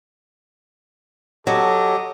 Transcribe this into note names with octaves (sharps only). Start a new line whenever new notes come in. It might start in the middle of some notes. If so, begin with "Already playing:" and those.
F#3 G4 A4 D#5